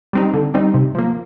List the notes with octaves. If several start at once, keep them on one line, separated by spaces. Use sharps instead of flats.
G3 C4 D#4
D3
G3 C4 D#4
C3
F3 A#3